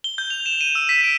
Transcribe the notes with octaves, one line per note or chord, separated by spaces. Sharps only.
G7
G6
F7
E7
D#7
E6
B6
D7